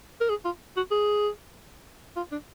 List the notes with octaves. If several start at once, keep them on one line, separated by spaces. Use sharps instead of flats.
A#4
G#4
F4
F#4
G#4
F4
D4